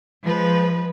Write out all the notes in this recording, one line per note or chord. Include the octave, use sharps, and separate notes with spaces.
F3 G#3 B4